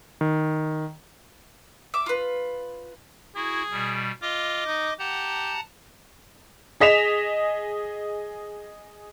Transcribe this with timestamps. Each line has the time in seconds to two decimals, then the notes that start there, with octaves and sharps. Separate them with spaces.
0.21 D#3
1.94 E5 D6
2.06 F4 B4
3.35 E4 F#4 G#4
3.71 B2 G3
4.22 F4 D#5 D6
4.66 D#4
4.99 G4 F#5 A5 A#5
6.80 G#4 D#5 B6 E7 F7